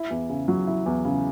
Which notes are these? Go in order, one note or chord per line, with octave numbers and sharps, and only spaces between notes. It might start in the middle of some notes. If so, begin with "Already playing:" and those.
Already playing: E4
E2
C#3
F#3
E4
E2
C#3